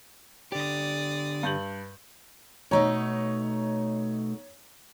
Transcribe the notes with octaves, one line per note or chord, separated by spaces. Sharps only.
D3 G4 D5 D#6
G2 G6 F#7
B2 A3 D#4 C#5 A#5